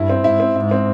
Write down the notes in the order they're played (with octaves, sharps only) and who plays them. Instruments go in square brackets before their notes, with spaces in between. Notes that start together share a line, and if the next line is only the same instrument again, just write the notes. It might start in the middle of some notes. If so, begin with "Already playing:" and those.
Already playing: [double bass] G2 [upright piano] E4
[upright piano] C4
[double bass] G#2 [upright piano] E4
[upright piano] C4
[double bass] G#2 [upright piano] E4
[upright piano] C4